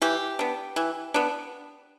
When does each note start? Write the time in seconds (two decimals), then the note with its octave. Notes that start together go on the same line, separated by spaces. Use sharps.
0.02 E3 G4
0.39 B3 D4
0.76 E3
1.14 B3 D4